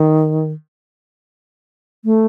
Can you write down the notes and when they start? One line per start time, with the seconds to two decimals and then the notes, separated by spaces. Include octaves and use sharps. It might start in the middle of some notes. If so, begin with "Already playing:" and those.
Already playing: D#3
2.05 A3